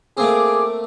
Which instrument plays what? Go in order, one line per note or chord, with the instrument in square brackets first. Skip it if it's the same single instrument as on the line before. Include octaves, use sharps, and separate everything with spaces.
[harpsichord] A3 A#3 C4 [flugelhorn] G#4 [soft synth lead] D6